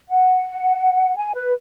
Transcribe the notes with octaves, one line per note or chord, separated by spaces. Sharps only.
F#5
G#5
B4